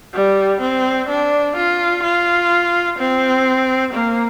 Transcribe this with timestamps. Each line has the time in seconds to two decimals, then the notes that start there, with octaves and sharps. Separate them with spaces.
0.14 G3
0.61 C4
1.09 D4
1.56 F4
2.03 F4
2.99 C4
3.94 A#3